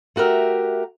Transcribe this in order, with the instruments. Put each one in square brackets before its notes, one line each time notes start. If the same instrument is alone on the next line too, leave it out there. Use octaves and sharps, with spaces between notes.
[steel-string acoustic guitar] A3 F#4 G4 A#4 E5